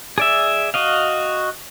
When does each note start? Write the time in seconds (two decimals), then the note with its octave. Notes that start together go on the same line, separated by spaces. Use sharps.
0.18 G#4 D5 E5
0.74 F#4 D#5 F5